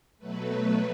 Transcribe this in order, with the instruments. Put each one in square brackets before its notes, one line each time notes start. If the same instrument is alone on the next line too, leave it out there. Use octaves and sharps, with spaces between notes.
[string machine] B2 F#3 A3 B4